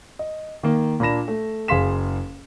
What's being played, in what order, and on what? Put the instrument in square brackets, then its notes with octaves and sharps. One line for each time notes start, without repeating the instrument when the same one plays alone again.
[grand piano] D#5
D#3 A#3
A#2 A#3 D4 B5 A#6 E7
A3
F#1 G#4 F5 C6 B6 E7